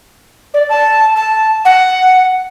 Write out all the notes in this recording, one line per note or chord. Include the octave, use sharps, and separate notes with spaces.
D5
A5
A5
F#5